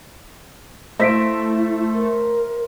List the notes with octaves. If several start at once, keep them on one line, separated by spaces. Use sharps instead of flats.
A3 E4 C5 E5 A#6 B6 D7
A#4